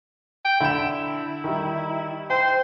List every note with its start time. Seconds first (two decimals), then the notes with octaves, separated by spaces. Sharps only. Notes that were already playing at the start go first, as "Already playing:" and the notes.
0.45 G5
0.60 D3 E4 B5 E7
1.44 D#3 G3
2.30 C5 G5